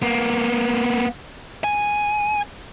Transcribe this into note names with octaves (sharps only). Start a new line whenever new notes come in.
A#3 B3
G#5